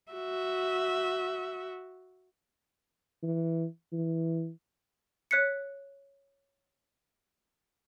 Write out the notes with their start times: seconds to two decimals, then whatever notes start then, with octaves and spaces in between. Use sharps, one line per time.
0.13 F#4 E5
3.23 E3
3.93 E3
5.31 C#5 F#6 B6 C#7